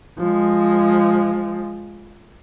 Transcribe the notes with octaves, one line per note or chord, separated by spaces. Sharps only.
F3 G#3